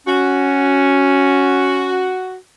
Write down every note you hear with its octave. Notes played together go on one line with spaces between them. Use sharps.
C#4 F#4